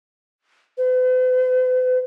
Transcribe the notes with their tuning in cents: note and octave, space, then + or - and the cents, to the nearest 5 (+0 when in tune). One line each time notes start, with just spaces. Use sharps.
B4 +45